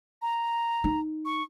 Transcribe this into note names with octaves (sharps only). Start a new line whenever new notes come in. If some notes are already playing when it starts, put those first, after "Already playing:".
A#5
D#4
C#6